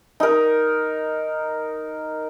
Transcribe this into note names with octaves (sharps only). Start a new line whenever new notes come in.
D#4 A#4